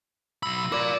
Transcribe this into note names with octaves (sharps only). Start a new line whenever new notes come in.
B1 B5 E6
A#4 D5 D6